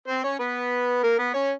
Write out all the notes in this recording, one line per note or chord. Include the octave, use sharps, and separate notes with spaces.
C4 C5
C#4 C#5
B3 B4
A#3 A#4
B3 B4
C#4 C#5